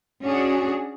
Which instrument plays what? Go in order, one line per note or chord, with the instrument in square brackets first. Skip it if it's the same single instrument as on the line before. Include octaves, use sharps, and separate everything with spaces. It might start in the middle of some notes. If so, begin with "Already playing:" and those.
[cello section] C#4 D4 F#4 G#4